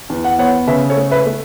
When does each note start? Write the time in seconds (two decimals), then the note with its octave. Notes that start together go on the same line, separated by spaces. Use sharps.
0.10 E2
0.25 F#5
0.39 B3 C#5 F#5
0.67 C#3 B4 E5
0.90 A4 C#5
0.97 A3
1.11 B4 E5
1.26 A3